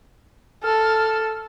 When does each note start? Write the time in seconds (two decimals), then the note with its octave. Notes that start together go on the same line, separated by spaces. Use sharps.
0.63 A4 F6